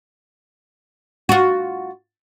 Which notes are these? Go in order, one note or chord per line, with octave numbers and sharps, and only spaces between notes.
F4 F#4